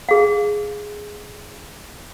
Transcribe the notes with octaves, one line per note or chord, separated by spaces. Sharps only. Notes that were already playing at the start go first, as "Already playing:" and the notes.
G#4 F5